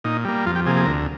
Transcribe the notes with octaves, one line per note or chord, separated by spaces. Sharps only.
A#2 D#4
G3 A#3
F2 F4
G4
C3 F3 A#3 G#4
G#4
D2 A#4